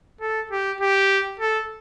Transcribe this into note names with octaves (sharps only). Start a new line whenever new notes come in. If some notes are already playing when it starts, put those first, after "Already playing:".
A4
G4
G4
A4